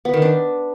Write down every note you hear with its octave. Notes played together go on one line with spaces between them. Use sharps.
B3
D#3
D4